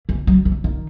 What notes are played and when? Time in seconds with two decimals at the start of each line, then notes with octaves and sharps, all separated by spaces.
0.09 E3
0.27 F#3
0.45 E3
0.64 D#3